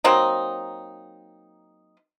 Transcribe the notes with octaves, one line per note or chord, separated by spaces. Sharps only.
F#3 A#3 C4 D#4